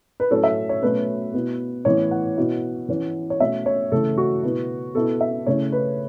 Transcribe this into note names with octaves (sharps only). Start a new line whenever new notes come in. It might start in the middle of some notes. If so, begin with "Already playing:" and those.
B4
A2 F#3 C#4 E4 A4
E5
C#5
B2 F#3 A3 C#4 B4
B2 B3 E4
A2 E3 B3 E4 C#5
F#5
B2 B3 E4
E3 C#4 E4
C#5
B2 A3 C#4 E5
C#5
C#3 E3 A3 E4 A4
F#4
B2 B3 E4
B2 B3 E4 A4
E5
C#3 A3 C#4 E4 C#5
B4